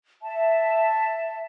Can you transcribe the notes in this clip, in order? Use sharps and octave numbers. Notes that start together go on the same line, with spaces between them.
E5 A5